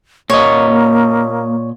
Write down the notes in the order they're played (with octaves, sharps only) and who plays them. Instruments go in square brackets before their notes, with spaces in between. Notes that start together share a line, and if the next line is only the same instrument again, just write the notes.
[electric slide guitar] A#2 D#5 [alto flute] A#3 [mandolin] C#5